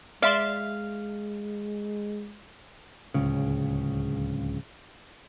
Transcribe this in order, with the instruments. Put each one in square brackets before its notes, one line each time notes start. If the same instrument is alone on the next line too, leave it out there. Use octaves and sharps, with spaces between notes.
[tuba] G#3 [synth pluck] D5 E5 C6 [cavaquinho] F5
[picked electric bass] D1 C#2 C#3